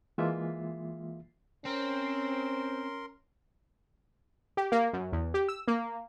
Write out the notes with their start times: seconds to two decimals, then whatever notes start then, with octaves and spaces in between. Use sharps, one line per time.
0.18 E3 G#3 A#3 F4 E5
1.65 C4 C#4 A#4 C6
4.57 G4
4.72 A#3
4.93 F#2
5.12 E2
5.34 G4
5.49 E6
5.68 A#3